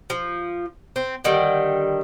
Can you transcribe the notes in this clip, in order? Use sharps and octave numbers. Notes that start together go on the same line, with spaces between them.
F3
C4
D3 D#3 G3